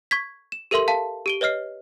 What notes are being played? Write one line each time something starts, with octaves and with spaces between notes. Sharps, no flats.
C#6 G#6 B6
E7
G4 A4 A#4 E5 C6 F#7
F5 A5
G4 D7 G7
B4 C#5 D#5 F6 C7